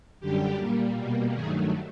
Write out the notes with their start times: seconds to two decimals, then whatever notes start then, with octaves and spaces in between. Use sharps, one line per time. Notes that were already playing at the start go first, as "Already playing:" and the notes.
0.20 F#2 D3 G3 G4
0.58 A#2 G3 A#3
0.96 B2 G3 A#3
1.33 G2 D#3 F#3 A3 G#4